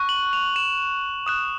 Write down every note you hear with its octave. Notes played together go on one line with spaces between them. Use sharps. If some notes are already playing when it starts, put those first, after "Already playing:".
Already playing: C#6 F#6
F#7
F7
E7
D#6 F#6 E7